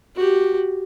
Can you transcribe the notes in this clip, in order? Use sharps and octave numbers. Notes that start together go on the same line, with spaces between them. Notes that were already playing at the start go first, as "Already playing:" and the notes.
F#4 G4